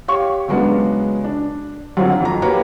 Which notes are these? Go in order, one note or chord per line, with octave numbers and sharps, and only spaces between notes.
G4 C#5 F5 C#6
C#3 F#3 G#3 B3 C#4 D4
D4
F#2 D3 F#3 C4 F4
F2 A#5
A#3 F#4 G4 B4 C#5 A#5